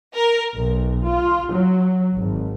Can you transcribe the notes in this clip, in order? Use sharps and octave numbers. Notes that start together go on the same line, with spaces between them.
A#4
B1
F4
F#3
G#1